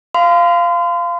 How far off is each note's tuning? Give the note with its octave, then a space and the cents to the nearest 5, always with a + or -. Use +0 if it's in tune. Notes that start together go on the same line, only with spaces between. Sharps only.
F5 -10 C6 -40